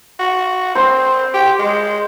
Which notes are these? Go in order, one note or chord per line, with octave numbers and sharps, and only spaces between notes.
F#4
C4 C5
G4
G#3